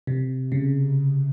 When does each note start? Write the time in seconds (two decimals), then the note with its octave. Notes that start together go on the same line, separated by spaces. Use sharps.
0.07 C3
0.52 C#3